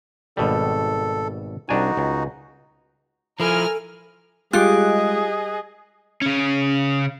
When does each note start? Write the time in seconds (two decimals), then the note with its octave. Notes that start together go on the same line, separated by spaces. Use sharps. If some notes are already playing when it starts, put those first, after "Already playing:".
0.37 G#1 B2 G3 A4
1.69 C2 D4 D#4 F#4 G#5
1.97 C#2
3.40 F3 E4 A4 A#4 G#5 F6
4.53 G3 G#3 F4 G4 G#4 D#5 F#6
6.22 C#3 C#4